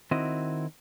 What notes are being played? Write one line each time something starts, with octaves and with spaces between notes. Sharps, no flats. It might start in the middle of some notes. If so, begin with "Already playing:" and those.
D#3 C4 E4 F#4 D#5